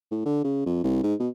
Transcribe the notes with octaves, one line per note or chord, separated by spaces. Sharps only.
A2
D3
C#3
F2
C2
G#2
B2